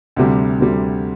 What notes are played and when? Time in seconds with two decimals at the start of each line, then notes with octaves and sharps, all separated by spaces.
0.16 D2 C3 G3
0.59 D2 C3 G3